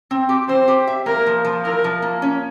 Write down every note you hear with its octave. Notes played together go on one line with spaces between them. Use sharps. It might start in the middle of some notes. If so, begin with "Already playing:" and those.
C4
G4
C4 C5
G4
E5
A#3 A#4
F3
F3
E4 A#4
F3
A#3
C#4